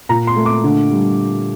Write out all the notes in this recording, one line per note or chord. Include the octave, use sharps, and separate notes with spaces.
A#2 A#5
C6
A3
D6
D3
G3